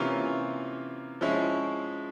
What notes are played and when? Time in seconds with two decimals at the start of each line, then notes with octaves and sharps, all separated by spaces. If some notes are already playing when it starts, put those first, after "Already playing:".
Already playing: C3 E3 A#3 C#4 F4
1.21 F3 G#3 C#4 E4